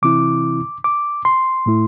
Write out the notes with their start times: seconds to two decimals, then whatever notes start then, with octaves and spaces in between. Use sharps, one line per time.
0.02 C3 E3 C4 E4 D6
0.84 D6
1.25 C6
1.66 A2 A3 E4